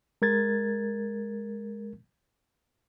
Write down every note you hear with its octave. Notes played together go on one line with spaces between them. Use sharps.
G#3 A#4 G#6 A6